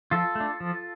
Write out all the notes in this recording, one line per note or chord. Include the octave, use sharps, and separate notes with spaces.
F3 F4 A4
A3 D4
F3